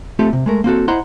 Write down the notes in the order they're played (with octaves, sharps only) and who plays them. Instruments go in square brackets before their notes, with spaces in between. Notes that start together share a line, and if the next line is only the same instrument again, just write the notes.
[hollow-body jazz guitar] A3 C4 F4 G4 A4
C3
G#3 A3 A#4
A#3 C4 F#4 A4
E4 C5 D#5 F#5 A#5 C6